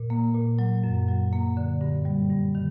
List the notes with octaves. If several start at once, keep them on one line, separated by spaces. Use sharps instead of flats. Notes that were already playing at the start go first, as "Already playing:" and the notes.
Already playing: A#2
A#3
A#2
F#3
F#2
F#3
A#3
D3
G2
G3
G2
D#3